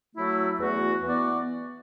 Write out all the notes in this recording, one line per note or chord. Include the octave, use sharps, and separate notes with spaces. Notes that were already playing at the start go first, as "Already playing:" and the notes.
F#3 A3 E4
E2 E3 A3 F#4
E3 B3 F#4 D5